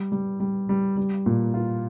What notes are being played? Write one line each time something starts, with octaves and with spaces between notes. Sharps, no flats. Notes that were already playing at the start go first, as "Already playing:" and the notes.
Already playing: G3
G3
G3
G3
G3
A#2
F4